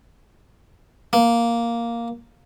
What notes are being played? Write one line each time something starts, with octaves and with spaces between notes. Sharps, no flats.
A#3